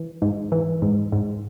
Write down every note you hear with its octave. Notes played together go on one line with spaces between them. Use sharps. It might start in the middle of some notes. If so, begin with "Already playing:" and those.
Already playing: E3
G#2
E3
G#2
G#2